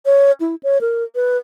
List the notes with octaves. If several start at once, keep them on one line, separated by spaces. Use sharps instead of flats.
C#5
E4
C#5
A#4
B4